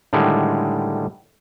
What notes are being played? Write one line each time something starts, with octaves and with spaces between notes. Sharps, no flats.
A2 D3 D#3 G3 G#3